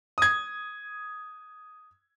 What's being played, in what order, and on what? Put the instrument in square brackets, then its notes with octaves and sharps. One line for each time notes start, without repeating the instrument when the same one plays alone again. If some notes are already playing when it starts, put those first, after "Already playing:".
[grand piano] D#6 G#6